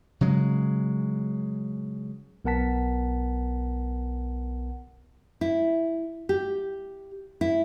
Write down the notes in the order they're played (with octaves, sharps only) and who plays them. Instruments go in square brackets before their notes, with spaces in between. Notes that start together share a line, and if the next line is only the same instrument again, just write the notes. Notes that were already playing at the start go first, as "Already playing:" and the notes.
[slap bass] C#3 F#3 G#3
[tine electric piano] B1 B3 A#4 F#5 A5 B6
[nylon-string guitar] E4
G4
E4